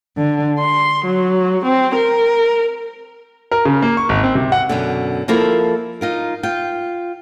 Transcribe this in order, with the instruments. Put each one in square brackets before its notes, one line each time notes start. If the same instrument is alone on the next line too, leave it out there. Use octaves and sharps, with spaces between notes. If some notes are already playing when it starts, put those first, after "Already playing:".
[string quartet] D3
C6
F#3
C4
A#4
[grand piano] A#4
C#3
A#3
C#6
G#1
C4
C3
F#5
[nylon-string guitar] F#2 B2 D3
F3 A#3 E4 A4 A#4 C5
D#4 F4 A#4
F4 G5